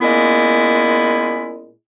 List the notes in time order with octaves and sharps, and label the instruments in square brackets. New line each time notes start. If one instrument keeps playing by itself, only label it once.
[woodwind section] A#2 G#3 A#3 B3 C#4 E4